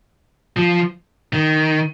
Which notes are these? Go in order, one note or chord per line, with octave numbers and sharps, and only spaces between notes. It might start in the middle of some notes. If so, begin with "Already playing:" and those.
F3
D#3